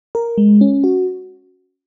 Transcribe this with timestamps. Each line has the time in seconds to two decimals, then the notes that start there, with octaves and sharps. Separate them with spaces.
0.15 A#4
0.38 G#3
0.61 C#4
0.84 F#4